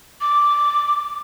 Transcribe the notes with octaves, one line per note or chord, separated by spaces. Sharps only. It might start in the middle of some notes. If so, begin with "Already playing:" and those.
D6